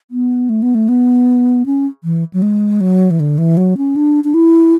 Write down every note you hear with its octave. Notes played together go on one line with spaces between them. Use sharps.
B3
A3
B3
A3
B3
C#4
E3
F#3
G#3
F#3
E3
D3
E3
F#3
C#4
D4
D4
E4